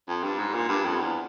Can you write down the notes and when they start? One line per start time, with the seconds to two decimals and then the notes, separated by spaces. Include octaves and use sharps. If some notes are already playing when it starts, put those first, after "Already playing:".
0.08 F2
0.23 G2
0.38 G#2
0.54 A#2
0.69 G2
0.85 F2
0.99 E2